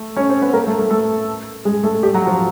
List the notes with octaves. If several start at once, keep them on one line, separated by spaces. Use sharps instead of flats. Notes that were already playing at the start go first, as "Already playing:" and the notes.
Already playing: A3 A4
C#4 C#5
C4 C5
B3 B4
A#3 A#4
A3 A4
A3 A4
A3 A4
G#3 G#4
A3 A4
G3 G4
F#3 F#4
F3 F4